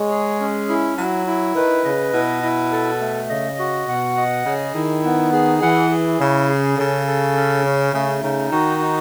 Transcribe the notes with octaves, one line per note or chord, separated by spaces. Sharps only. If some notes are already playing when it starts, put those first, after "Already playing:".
Already playing: G#3 C#5
G#4
C#4
E4
F#3 E4
E4
D#3 B4
C#3 D#5
B2 E4
E4
A4
A3
C#3 D#5
F#4
B2 F#5
D#5
C#3 G#4
D#3 E4
B3
G#4
E3 F#5
G#4
C#3 E4
G#4
C#3 A4
A4
C#4
C#4
C#3 A3
C#3 D#4
D#3 F#4
D#4